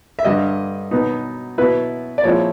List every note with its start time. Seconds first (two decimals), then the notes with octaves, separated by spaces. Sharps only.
0.19 E5
0.25 G2 D3 G3 D#5
0.91 B2 F#3 B3 D#4
1.58 B2 F#3 B3 E4 B4
2.18 D5
2.24 A#2 F3 G#3 C4 E4 C#5